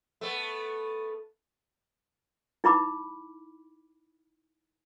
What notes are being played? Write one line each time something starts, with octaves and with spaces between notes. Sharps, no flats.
A3 B3
D#4 E4 B5 D6